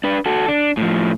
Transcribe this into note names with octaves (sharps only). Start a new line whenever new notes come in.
D4 B4
F#4 A4
D4
A2 F3